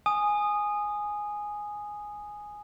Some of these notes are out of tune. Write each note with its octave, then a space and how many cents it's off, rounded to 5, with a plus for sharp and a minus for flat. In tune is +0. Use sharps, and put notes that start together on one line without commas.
G#5 +0 D#6 -10